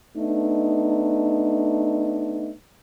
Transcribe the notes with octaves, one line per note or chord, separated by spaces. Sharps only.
A3 B3 D4 D#4